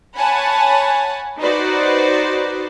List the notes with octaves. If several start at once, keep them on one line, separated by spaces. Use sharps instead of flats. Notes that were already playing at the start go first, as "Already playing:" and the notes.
C#5 F#5 G#5 A5 B5
D#4 F#4 B4 C5 D5